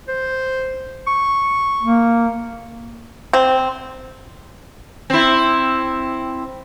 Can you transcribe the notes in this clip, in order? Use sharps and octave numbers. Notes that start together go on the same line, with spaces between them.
C5
C#6
A#3
C4
C4 E4